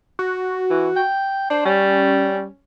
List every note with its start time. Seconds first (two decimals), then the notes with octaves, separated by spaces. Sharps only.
0.19 F#4
0.70 E3
0.96 G5
1.50 D4 C5
1.65 G3 C#4